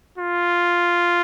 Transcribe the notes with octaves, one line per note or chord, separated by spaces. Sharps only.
F4